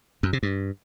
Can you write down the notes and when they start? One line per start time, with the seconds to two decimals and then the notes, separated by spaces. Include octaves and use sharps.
0.23 F#2
0.33 C3
0.43 G2